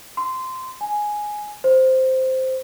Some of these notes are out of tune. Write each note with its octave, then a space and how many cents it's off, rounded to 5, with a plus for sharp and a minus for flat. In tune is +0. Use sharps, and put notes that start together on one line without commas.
C6 -15
G#5 +5
C5 -5